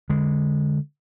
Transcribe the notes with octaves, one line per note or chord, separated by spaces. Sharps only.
D3 G#3